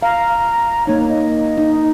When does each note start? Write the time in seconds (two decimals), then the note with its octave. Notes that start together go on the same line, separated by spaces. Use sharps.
0.02 F5 A#5
0.87 A#3 D#4 C#5
1.09 D#5
1.58 D#4